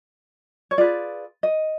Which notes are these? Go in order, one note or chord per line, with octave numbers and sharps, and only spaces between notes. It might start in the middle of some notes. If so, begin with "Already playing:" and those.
C#5
F4 G#4 B4 D5
D#5